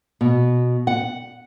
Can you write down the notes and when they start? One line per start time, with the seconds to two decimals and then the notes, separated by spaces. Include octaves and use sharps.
0.21 B2
0.87 F#5